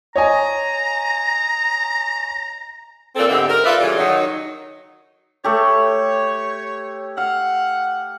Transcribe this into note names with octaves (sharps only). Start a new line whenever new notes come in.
C#5 D#5 G#5 A#5
A#2 C4 A4
G#2 D3 B3 C4 G4 E5
A#4
F4 A4 B4 D5 E5
C#3 E3 G3 F4 G#4 A4
D#3 F#3 D#4
A3 G4 C#5
F5 F#5